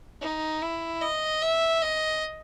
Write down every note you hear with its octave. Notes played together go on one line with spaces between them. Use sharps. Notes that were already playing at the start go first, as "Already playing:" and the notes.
D#4
E4
D#5
E5
D#5